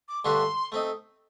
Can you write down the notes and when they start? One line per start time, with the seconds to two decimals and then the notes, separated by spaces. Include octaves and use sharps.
0.09 D6
0.24 G2 D3 A3 D4 F#4 C6
0.72 A3 C4 D#4